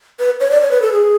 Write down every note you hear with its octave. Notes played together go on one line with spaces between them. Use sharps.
B4
C#5
D5
C#5
B4
A4
G#4